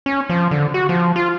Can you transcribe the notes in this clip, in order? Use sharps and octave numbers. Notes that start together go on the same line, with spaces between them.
C#4
F3
D3
F#4
F3
F4